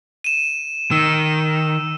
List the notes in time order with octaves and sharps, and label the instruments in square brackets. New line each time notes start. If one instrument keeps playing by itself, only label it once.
[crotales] D#7 E7
[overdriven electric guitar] D#3 [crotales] E6